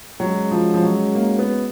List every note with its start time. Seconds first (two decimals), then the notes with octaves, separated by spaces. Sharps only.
0.20 F#3 G#3 C#4 F#4
0.51 F3
0.74 F3
0.83 F#3
1.15 A#3
1.39 B3